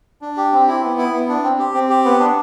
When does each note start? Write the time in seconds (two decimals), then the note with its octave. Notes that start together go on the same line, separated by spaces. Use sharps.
0.22 D4
0.37 G4
0.52 C4
0.67 E4
0.83 B3
0.98 E4
1.13 B3
1.29 D4
1.44 C4
1.59 G4
1.74 C4
1.89 G4
2.05 B3
2.20 D4